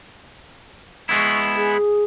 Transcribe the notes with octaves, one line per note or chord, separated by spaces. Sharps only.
G#3 B3 E4 C#6
G#4